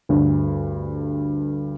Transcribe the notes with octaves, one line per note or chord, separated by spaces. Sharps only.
D2 G2